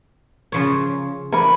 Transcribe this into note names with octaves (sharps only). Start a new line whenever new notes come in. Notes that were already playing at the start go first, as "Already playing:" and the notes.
C#3 F3 C#5
D4 A#4 G#5 B5 C#6